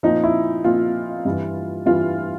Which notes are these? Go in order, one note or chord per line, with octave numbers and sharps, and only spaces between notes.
A#2 F3 D#4
E4
A#2 F3 F4
G2 E3
G2 E3 F4